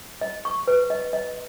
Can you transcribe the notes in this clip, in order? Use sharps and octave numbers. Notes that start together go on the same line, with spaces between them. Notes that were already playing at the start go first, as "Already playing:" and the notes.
D#5
C#6
B4
D#5
D#5